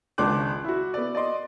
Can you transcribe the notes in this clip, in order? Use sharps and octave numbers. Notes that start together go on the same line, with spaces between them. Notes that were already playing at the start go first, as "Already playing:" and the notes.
G#1 C#2 D4 C6 D6 F#6
E4 F#4
B3 D5
D5 D#5 C6